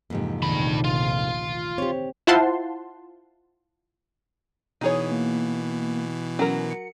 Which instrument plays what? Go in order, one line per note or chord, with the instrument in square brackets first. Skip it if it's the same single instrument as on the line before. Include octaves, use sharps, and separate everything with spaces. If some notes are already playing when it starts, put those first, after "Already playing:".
[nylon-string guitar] F2 G#2 C3 [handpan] E3 A#3
[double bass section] F1 A#1 D#2 [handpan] D#3 [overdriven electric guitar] D4 B5
[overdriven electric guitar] F4
[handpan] C4 [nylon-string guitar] G4 C#5
[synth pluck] E4 F4 C5 F#5 A5 C6
[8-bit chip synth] B2 E3 [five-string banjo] D#4 G#4 C#5 [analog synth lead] D#6
[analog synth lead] A#3
[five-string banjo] F#3 A#4 [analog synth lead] C#4
[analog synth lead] C#7